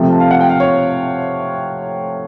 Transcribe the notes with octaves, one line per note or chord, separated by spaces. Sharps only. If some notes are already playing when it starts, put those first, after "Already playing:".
Already playing: C3 F3 A3 C4
A5
F5
F#5
G5
F5
C#5